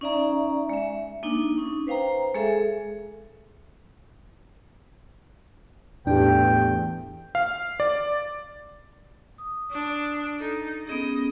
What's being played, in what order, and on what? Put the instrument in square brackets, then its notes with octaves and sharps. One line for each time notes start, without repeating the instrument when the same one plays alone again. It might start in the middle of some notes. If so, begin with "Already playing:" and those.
[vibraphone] C#4 D#4 D5 E5 A#5
G#3 E5
A#3 D4 D#4
C#4 D#4
B4 C5 F5 G5 A#5
G#3 G#4 A4 E5
[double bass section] E2 A3 [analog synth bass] A2 [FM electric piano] D4 G4 [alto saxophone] G5
[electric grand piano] F5
D5
[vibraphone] D#6
[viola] D4
[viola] D#4 [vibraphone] A4
[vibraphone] B3 C#4 G#4 [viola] D#5